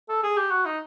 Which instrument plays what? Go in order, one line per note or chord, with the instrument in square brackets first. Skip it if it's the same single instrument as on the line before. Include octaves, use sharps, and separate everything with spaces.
[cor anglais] A4
G#4
G4
F#4
D#4